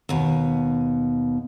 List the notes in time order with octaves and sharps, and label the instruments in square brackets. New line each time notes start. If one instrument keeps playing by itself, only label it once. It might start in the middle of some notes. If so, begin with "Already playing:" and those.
[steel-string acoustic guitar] D#2 B2